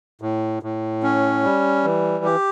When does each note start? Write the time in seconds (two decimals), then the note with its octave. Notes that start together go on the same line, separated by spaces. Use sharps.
0.22 A2
0.63 A2
1.03 C#4
1.44 G3
1.84 E3
2.25 G4